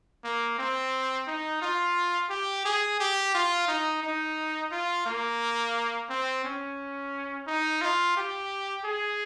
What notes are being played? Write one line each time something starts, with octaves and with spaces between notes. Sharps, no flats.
A#3
C4
D#4
F4
G4
G#4
G4
F4
D#4
D#4
F4
A#3
C4
C#4
D#4
F4
G4
G#4